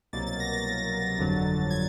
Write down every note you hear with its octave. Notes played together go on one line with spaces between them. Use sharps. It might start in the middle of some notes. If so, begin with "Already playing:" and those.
C2 B2 F#3 A#3 A6
A6
A#6
A6
A6
G1 F2 D3 F#3
G#6